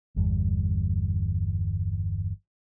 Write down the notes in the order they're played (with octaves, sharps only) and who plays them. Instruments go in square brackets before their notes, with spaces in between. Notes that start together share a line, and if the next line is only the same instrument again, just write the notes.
[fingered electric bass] G1 E2 G3